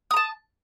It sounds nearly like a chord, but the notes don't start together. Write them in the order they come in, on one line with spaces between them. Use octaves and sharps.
D#6 A#5 A5